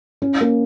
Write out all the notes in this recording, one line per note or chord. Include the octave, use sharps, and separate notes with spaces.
C#4
A#3